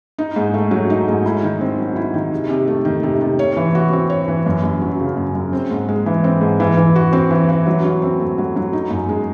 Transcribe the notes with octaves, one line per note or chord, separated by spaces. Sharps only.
D#4
G#2
A3
F#3
D#4
G#2
E4
D#3
C4
F#3
E4
D#3
C3
C3
A3
D#3
C3
C3
C#5
E3
F#4
C4
C#5
E3
F#2
F#2
F#3
C#3
F#2
F#2
C4
G#2
G#3
E3
C4
G#2
E3
E3
F#4
C4
E3
E3
F#3
F#3
C4
A3
F#3
F#3
D#4
F#2
G#3